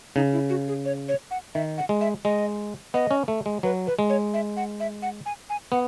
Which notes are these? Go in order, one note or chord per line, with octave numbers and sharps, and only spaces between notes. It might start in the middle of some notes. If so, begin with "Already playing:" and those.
C#3 D#4
E4
F#4
G#4
C#5
C#5
F#5
D#3 E5
F#5
G#3
E5
G#3 D#5
B3 D#5
C#4
A3
G#3
F#3 B4
B4
G#3
C#5
E5
F#5
E5
F#5
G#5
G#5
B3 F#5